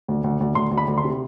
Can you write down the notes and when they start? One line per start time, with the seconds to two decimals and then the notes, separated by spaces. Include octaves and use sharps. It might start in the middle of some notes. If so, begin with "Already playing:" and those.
0.08 D2
0.24 D2
0.40 D2
0.55 D2 C6
0.71 D2
0.78 B5
0.88 D2
0.98 C6
1.04 C3